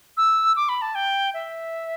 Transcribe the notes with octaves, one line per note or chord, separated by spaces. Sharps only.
E6
D6
B5
A5
G5
E5